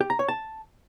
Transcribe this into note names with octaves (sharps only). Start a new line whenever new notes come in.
G4
A#5
C#5
A5